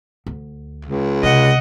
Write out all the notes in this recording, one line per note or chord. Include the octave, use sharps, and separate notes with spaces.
D2
C#2
C3 D#5 F#5